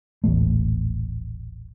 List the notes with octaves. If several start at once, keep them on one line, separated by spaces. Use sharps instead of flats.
D#1 A1 A3